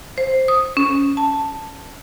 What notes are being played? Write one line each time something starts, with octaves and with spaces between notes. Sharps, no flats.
C5
D#6
C#4
A5